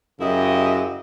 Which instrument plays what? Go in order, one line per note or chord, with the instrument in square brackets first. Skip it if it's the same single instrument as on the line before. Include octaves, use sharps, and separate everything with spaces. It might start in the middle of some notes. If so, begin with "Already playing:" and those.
[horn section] F#2 C#3 E4 G4 D#5